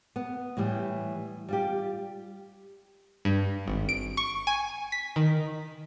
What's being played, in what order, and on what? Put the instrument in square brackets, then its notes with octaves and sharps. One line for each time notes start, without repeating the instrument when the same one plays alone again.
[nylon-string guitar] B3
A2 E3 G3
G3 F4 G4
[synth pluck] G2
G#1
D7
C#6
G#5
B6
D#3